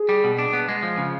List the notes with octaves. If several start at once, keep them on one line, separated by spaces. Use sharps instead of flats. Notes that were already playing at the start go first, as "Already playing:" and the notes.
Already playing: G#4
G3
B2
D4
B3
G#3
F3
C#3